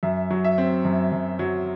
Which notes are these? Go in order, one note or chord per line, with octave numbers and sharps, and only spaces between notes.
F#2 E5
F#3
E5
C4
F#2
F#2
F#3